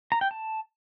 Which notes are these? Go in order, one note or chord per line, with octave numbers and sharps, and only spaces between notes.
A#5
G5
A5